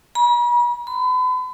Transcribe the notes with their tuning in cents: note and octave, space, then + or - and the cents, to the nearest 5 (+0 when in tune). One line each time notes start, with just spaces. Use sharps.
B5 -45
B5 +40